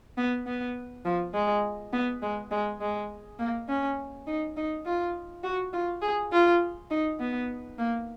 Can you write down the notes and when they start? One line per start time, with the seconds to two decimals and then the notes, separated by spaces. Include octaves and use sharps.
0.18 B3
0.46 B3
1.05 F3
1.34 G#3
1.93 B3
2.22 G#3
2.51 G#3
2.81 G#3
3.39 A#3
3.68 C#4
4.27 D#4
4.57 D#4
4.86 F4
5.44 F#4
5.73 F4
6.02 G#4
6.32 F4
6.91 D#4
7.20 B3
7.78 A#3